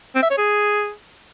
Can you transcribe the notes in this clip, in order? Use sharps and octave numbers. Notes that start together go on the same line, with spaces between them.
C4
E5
C#5
G#4